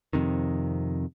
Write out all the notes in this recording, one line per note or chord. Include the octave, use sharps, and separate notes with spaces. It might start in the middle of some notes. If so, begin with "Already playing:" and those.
F2 C3 D#3